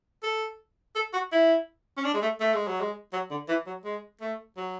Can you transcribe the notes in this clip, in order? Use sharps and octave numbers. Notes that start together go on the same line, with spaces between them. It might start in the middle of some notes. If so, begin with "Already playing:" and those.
A4
A4
F#4
E4
C#4
D4
G#3
A3
A3
G#3
F#3
G#3
F#3
D3
E3
F#3
G#3
A3
F#3